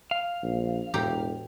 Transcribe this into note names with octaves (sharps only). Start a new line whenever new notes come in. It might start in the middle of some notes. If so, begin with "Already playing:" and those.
F5
A#1
E1 A2 G4 A#5